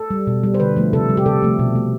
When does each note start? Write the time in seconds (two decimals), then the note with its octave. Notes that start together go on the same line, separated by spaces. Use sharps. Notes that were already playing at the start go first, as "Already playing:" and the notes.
Already playing: A4
0.10 G3
0.27 B2
0.43 G3
0.54 C5
0.60 D3 B4
0.77 F3 A3
0.93 C3 A4
1.09 G3
1.17 G4
1.26 C3 A4
1.42 F3 A3
1.59 B2
1.75 A3